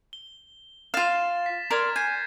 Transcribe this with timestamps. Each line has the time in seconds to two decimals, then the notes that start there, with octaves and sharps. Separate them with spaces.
0.13 G7
0.94 F4 F5 A6 E7
1.46 B6
1.70 A#4 D5 C6 F6 G#6 A6
1.96 G#5 G6 C7